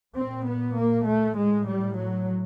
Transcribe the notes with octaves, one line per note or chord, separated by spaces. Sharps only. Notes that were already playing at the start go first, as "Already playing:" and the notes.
A#2 C4
B3
A#3
A3
A2 G#3
G3
F#3